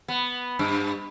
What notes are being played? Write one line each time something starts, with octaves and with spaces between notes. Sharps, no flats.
B3
G2